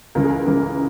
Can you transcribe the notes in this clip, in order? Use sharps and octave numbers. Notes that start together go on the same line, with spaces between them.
C#2 C#3 E3 A#4
G#4
A#4
C#2 C#3 E3 A#4